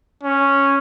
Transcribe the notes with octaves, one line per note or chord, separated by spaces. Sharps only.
C#4